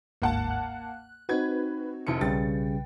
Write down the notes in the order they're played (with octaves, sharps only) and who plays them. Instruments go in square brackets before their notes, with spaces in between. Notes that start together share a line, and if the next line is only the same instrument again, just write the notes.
[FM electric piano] G1 D2 G#2 [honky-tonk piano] A#3 F#5 A5
[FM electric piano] F#6
[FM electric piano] C4 D#4 F#4 [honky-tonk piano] B4 G#6
[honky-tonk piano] F1 E4 C#7
[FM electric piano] B1 B4 G5 [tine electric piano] C#3 G3 [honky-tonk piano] A6